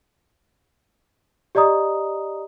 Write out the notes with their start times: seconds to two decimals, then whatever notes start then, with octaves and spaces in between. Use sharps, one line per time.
1.55 G4 D5 D#5 A#5 D#6